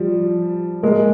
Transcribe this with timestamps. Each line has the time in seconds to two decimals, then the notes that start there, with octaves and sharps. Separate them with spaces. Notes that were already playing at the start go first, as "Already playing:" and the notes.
Already playing: F3 G3
0.83 G#3 A#3